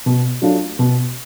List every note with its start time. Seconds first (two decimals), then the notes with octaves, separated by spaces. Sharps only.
0.06 B2
0.42 F#3 A3 D4 F4
0.79 B2